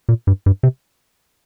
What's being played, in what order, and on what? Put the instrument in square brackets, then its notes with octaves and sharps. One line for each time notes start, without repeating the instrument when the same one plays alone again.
[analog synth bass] A#2
G2
G2
C3